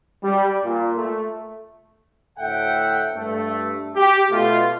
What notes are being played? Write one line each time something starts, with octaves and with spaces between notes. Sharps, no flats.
G3
A#2
A3
D2 A2 A4 E5 F#5 G5
G2 A3
G4
B2 A3 F4